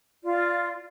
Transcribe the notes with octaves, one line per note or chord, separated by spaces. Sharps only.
F4 D5